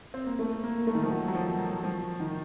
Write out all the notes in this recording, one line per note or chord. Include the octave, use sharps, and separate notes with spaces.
C4
A#3
A3
A#3
A3
D#3
F3
F#3
F#3
F3
F#3
F3
D#3